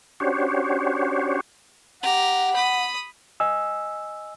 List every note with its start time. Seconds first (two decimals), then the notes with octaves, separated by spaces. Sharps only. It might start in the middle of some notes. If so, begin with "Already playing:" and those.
0.20 C#4 D4 F#4 G4 C5 C#5
2.02 G4 F#5 A#5
2.54 B5 D#6
3.40 D#5 G#5 E6